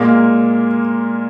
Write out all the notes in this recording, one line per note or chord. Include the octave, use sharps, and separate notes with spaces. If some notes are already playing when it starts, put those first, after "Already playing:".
Already playing: A#2 G#3 A#3 A#4